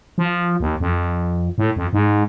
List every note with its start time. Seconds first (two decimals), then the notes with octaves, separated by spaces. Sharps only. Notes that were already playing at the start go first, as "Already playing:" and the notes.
0.18 F3
0.60 D#2
0.80 F2
1.58 A2
1.76 F2
1.93 G#2